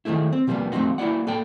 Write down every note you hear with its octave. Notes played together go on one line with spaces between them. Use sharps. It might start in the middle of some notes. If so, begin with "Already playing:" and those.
D#3 F3 G#3 A3 E4
C4
C3 F3 G3 G#3 A#3 B3
F3 A3 C4 D#4 F#4
A#3 E4 F#4 D5 F#5
A#3 A4 G5